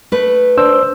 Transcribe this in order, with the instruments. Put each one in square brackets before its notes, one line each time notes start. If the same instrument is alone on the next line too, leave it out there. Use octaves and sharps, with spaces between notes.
[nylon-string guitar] A3 B4
[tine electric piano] D4 C5 E6